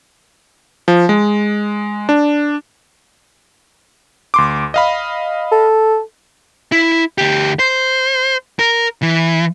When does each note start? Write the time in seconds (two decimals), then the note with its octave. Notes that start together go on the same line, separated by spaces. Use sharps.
0.88 F3
1.09 G#3
2.09 D4
4.34 D2 C6 D6
4.74 D#5 F5 B5
5.52 A4
6.72 E4
7.18 D2 G4
7.59 C5
8.59 A#4
9.02 E3